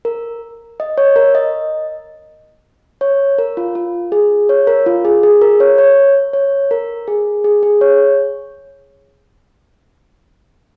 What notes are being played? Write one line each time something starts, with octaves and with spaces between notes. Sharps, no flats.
A#4
D#5
C#5
A#4
D#5
C#5
A#4
F4
F4
G#4
C#5
A#4
F4
G#4
G#4
A#4
C#5
C#5
C#5
A#4
G#4
G#4
G#4
C#5